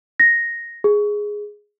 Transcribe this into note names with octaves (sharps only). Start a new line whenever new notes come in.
A#6
G#4